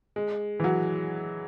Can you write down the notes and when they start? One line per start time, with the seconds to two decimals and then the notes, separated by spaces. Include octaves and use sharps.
0.16 G#3
0.60 E3
0.64 F#3